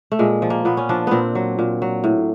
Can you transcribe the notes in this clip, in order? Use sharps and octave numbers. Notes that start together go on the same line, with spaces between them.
A3
A#2 G#3
F3
A#3
A#2 B3
C#4
F3 D4
A#2 B3 C4
F#3
A#2
F#3
A2